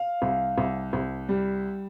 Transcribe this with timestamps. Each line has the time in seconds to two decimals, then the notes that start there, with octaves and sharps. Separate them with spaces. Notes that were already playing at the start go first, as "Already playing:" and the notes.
Already playing: F5
0.22 C2
0.58 C2
0.93 C2
1.29 G3